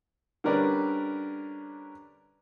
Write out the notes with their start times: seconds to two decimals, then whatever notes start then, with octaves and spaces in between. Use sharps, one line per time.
0.44 D3 G3 C#4 A#4 B4 D5